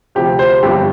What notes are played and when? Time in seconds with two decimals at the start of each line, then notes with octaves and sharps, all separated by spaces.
0.15 D2 C3 F3 G4
0.39 C5
0.63 G1 G2 F3 G4